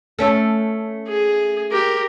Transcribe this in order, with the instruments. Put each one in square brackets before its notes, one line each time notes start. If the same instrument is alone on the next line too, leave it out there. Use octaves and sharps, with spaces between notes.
[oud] A3 C#4 A4
[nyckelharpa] G#4
G4 A#4